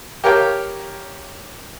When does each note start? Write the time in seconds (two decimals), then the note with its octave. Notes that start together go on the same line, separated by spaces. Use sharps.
0.24 G4 A#4 C#5 F5 G5